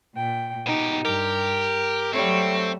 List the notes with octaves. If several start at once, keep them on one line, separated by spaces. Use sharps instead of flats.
A#2 G5
B2 D#4 G4
G2 G4 A#4
F#3 G3 A3 C4 C#5